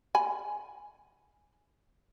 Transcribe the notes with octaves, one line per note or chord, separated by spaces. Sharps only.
G#5 B5